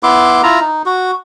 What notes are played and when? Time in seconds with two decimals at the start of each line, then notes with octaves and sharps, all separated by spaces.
0.03 B3 E4 C6 D6
0.43 E4 F4 A#5
0.60 D#4
0.86 F#4